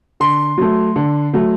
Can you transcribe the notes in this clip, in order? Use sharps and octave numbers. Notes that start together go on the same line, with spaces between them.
D3 C6
F#3 A3
D3
F#3 A3